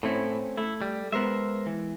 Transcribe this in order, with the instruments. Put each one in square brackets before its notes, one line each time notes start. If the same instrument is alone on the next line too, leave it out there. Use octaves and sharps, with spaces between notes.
[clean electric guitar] A2 E4 [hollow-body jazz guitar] A3 C4 C#4
[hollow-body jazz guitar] A3 [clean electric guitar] E4
[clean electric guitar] G3
[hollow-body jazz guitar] G#3 B3 [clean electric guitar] A#4 C5 E5
[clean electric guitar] E3